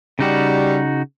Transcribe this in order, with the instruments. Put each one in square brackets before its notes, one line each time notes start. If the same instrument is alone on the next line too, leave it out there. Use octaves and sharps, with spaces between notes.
[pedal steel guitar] C#3 D#4 F#4 [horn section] G3